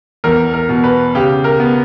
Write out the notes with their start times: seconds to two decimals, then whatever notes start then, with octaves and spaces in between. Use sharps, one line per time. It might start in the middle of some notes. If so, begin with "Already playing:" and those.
0.24 E2 A#4
0.54 A#4
0.69 B2
0.84 B4
1.15 C#3 G4
1.44 A#4
1.60 B3